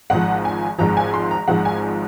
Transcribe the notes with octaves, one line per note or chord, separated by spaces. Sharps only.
G#1 G#2 F3 F#5
G#5
G#1 G#2 F3 A#5
G#5
C6
A#5
G#1 G#2 F3 F#5
G#5